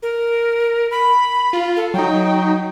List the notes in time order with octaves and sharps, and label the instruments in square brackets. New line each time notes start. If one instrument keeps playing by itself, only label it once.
[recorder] A#4
B5
[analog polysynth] F4
[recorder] A4
[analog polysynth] F#3 D#4 [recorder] G5